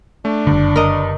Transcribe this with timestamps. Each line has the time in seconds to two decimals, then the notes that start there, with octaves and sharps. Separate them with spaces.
0.25 A3 D4
0.47 F#1 G2 D3
0.76 A#4 D#5